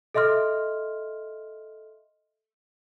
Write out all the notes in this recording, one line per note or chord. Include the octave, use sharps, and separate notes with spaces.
A4 D#5 E5 C6 F6